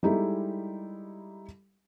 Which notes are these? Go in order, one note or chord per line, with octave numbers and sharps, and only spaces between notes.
G3 G#3 D#4 E4 G4 A4